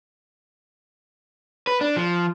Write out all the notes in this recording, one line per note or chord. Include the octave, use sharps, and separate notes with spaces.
B4
D4
F3